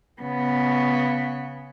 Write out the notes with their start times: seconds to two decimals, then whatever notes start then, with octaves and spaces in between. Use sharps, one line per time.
0.22 C#3 B3